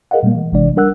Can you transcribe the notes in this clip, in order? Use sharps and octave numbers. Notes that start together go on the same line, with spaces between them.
G#4 A#4 D#5 F5 F#5
A#2 G3 G#3 A#3
E3
G#1 C3 E3 G#3 D4 D5
G3 D4 A#4 F#5 E6 F#6